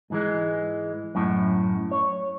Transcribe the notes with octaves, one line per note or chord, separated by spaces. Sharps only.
G#2 E3 G#3
F#2 A2
C#5